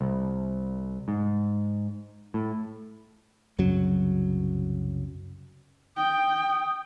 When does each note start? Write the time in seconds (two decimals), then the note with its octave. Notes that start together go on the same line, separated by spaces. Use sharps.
0.01 C2
1.08 G#2
2.34 A2
3.58 C2 F#2 C#3 F#3
5.97 G5 D#6